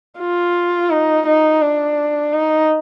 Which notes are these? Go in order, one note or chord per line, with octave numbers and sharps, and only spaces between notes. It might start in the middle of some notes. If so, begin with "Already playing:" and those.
F4
D#4
D#4
D4
D#4